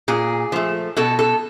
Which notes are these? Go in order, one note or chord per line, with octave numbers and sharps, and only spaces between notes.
A#2 G#4
F3 A3
B2 A4
A4